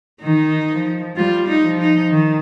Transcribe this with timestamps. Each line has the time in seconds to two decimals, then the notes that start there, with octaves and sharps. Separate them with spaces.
0.22 D#3 D#4
0.70 F3
1.16 G3 F4
1.48 D#4
1.65 F3
1.79 D#4
2.11 D#3